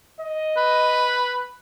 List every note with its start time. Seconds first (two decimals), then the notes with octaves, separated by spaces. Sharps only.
0.20 D#5
0.57 B4